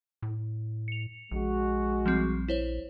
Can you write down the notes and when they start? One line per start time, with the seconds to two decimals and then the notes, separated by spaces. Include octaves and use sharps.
0.22 A2
0.88 C#7 F7
1.31 A#1 G#3 F#4
2.06 F3 G3 C4
2.48 E4 C5 C#5